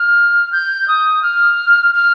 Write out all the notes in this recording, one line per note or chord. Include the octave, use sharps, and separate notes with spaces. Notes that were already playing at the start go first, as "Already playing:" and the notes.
Already playing: F6
G6
D#6
F6
F6